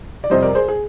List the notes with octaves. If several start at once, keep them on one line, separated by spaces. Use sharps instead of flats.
D5
F2 C3 G3 C5 D#5
A#4 D5
G#4 C5
G#4